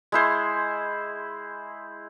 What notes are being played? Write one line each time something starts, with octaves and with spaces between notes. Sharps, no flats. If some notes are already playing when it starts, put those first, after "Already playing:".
G#3 E4 C5